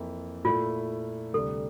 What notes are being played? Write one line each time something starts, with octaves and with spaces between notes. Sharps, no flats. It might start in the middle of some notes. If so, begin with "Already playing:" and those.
Already playing: F2 E3 A#3 E4
A#2 A3 E4 F4
D2 C3 G3 A4